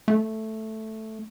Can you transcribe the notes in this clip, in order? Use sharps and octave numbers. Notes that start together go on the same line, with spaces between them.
A3